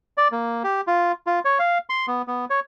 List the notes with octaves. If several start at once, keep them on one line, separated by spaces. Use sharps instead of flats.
D5
A#3
G4
F4
F4
C#5
F5
C6
B3
B3
C#5